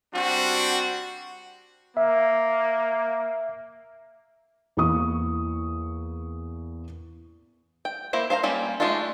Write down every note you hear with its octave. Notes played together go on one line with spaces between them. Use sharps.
G3 C4 D4 F#4
A#3 E5
E2 A#3 E4 C#6 D#6
G5
A#3 E4 C5
C5 F5 G#5 A#5
G3 A#3 C#4
G#3 A3 D4 D#4 F4